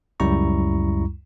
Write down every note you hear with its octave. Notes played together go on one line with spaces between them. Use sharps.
C#2 F#2 G3 E4 A#5 C#6